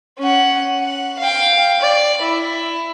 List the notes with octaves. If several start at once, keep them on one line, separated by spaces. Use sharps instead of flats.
C#4 F#5
F#5
F5 G5
D5
E4